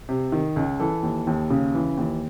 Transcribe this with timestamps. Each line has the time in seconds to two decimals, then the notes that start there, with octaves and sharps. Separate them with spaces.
0.09 C3
0.32 D#3
0.56 C#2
0.80 E3 A4
1.03 D#2
1.27 D#2
1.50 C#3
1.74 E3
1.97 D#2